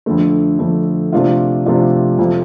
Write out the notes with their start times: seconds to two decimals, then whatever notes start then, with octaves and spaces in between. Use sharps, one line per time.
0.06 F2 D3 A3
0.59 F2 D3 A3
1.12 C3 F3 A3 D4 F4
1.66 C3 F3 A3 D4 F4
2.19 F2 C3 F3